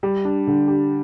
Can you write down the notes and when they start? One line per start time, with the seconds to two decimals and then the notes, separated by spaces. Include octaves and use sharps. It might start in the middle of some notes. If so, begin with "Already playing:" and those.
0.03 G3
0.25 D4
0.47 D3
0.68 G4